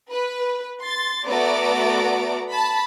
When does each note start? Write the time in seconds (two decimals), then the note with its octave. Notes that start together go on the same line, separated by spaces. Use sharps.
0.11 B4
0.81 C6 A6
1.26 A3 B3 F#4 D5 A#5 D7
2.51 A5 B5